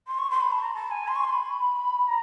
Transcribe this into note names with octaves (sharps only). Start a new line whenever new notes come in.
C6
C#6
C6
B5
A5
A#5
A5
G#5
C6
C#6
C6
B5
A#5